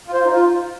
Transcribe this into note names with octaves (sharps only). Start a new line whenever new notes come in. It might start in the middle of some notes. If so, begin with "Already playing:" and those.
F4
C5
F4
D#4
F4